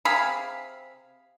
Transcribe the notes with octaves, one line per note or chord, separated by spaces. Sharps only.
C3 G#4 F5 B5